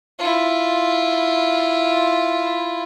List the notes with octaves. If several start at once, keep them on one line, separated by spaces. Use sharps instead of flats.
E4 F4